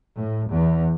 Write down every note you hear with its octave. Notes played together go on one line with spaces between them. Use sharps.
A2
E2